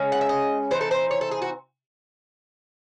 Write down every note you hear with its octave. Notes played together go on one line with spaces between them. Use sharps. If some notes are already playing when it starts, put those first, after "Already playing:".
Already playing: C#3 G#3 C#4
F#5
E5
D#5
E3 C4 D#4 C5
A4
C5
C#5
A4
G#4
F#4